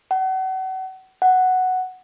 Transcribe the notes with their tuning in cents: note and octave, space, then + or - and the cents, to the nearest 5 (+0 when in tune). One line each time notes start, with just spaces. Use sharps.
F#5 +35
F#5 +0